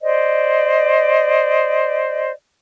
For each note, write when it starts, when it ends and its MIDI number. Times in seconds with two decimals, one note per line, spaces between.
0.02 2.31 72
0.02 2.31 74
0.02 2.31 75